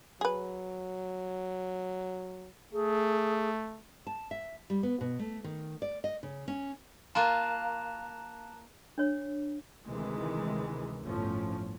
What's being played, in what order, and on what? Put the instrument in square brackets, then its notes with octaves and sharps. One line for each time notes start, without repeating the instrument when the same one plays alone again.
[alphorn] F#3 [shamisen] G#4 B4
[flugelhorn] A3 [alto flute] G#4
[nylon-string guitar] A5
E5
G3
B3
B2
A3
D#3
D5
D#5
C#3
C#4
[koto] A#3 F4 [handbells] A5 A#5 F#6
[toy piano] D4 C#5
[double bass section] D2 C3 D#3 E3 G#3
G1 E2 A2 F3 A3 C#4